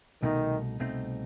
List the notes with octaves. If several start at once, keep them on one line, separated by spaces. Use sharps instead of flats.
C2 B2 D#3 A3 C4 D#4
C2 B2 A3 C4 D#4